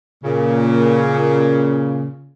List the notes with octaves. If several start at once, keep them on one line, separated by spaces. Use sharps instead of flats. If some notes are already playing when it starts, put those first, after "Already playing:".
A#2 C#3